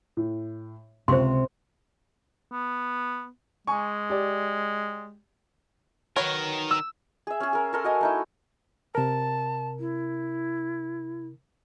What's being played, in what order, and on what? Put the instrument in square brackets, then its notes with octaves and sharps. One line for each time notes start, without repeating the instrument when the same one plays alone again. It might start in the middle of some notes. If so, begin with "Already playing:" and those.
[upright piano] A2
[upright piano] C#2 C#6 [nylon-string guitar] C3 [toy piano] C5 C6
[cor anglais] B3
[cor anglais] G#3 [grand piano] G#5 C#6
[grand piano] G4 D5
[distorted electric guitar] D#3 A#4 [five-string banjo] F#3 B4 C#5
[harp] E6
[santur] G#4 E5
C#4 G#4
G#4 A#4
A4 A#4 C6
F#4 D#5 G#5
A3 D#4 E4
[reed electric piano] C3 A#4 [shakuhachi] A5
[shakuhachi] E4